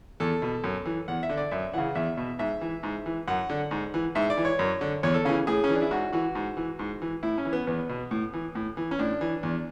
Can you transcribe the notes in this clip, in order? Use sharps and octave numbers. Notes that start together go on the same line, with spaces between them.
E2 A4
B2
F#2
E3
E2 F#5
E5
D3
D5
F#2 E5
C#3 E3 F#5
E2 E5
B2
G#2 E5
E3
G#2
E3
F#2 F#5
D3
G#2
E3
G#2 E5
D5
E3
C#5
F#2
D3
E2 C#5
A4
C#3 E3 C#4
A2 G#4
C#4
E3 D4
E4
G#2 F#4
E3 F#4
G#2
E3
G#2
E3
A2 E4
C#4
E3
B3
E2 B3
B2
A2
E3
A2
E3
C#4
A2 D4
E3
E2